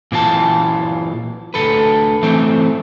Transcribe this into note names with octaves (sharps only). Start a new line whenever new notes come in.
A#2 E3 F4 A5
D2 C#3 A4 B4
E3 A3 C4